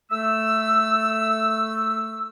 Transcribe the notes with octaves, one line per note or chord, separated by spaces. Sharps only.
A3 E6